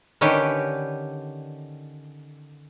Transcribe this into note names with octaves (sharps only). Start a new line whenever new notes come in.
D3 D#3 C#4 G4 B4